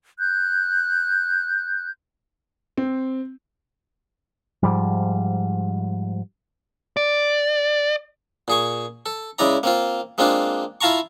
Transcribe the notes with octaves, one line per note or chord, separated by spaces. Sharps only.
F#6 G6
C4
G#2 F3 G3
D5
A#2 G#4 C#6
A4
C#3 G#3 E4 D5 A#5
A#3 C4 F4
G#3 A#3 C4 D4 F4
E4 F4 F5 A5 A#5 C#6